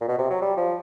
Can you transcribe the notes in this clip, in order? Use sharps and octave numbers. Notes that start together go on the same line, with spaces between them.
A#2
B2
C3
F#3
G3
F3